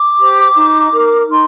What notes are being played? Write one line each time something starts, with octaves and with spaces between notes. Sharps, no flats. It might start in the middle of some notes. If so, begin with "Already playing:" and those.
Already playing: D6
G4 C5
D#4
A#4
D#4 C6